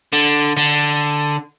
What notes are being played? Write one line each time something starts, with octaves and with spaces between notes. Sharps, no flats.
D3
D3